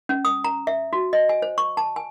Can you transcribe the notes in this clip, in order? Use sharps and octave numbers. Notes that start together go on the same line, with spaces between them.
C#4
D#6
A#5
E5
F#4
D#5
G#5
C5
C#6
A5
G#5